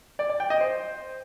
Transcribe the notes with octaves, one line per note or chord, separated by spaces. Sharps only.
D5
D5
G5
D#5
C5